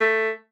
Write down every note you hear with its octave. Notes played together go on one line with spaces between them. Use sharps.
A3